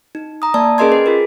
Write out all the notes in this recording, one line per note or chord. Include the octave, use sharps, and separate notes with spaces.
D#4
A#5 D#6
A#3 D5 A5
C#4 G#4 A#4 D#5 C6 G#6
B4
F4 G#4 A#4